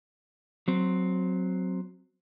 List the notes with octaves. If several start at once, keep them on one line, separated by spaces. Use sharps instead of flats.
F#3 C4